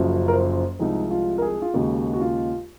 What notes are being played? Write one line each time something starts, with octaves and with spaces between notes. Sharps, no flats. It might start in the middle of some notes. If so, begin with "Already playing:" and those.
Already playing: F#1 F#2 F3
A#4
C5
C2 C3 F3 G#3 D#4
F4
A#4
G#4
F4
D#2 C#3 G#3 F#4
F#4
F4